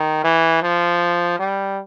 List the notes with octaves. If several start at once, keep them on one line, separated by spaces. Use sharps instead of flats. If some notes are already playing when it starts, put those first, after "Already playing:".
Already playing: D#3
E3
F3
G3